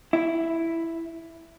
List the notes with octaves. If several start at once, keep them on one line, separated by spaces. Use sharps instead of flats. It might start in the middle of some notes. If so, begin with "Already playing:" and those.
E4